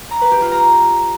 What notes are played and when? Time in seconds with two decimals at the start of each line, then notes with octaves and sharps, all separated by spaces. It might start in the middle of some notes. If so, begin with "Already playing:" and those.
0.11 A#5
0.21 B4
0.31 G4
0.42 F4
0.52 A#5